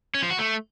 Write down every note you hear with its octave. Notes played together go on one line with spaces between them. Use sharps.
C#4
F3
F#4
A3